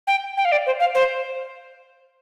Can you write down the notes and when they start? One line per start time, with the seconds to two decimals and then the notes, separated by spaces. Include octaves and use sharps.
0.07 G5
0.37 G5
0.45 F5
0.52 D5
0.66 C5
0.80 F5
0.95 C5